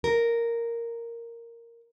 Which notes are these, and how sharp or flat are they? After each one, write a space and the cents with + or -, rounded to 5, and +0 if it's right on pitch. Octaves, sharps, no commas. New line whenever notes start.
A#4 -5